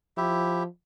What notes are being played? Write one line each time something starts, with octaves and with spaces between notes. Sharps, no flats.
F3 E4 G4 E5